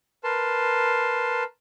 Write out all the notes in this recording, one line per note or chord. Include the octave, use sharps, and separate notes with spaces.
A#4 B4 A5 C6